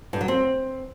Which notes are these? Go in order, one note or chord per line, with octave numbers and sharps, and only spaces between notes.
G2
F#3
C4